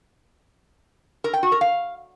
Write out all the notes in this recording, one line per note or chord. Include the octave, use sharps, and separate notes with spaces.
A#4
G5
F#4
A#4
F5